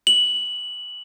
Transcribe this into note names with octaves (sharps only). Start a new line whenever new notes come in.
F#7